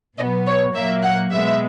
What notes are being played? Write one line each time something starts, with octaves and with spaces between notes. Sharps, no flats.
B2 F#3 B3 D#5
C#5
A#2 F#3 A#3 E5
F#5
B2 G#3 B3 E5